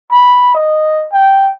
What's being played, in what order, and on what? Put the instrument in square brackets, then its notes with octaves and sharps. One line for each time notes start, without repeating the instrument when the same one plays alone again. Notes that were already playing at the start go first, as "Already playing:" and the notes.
[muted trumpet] B5
D#5
G5